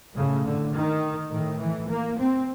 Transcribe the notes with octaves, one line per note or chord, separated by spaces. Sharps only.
A2 C#3
D3
D#3
A2 D#3
E3
A#3
C4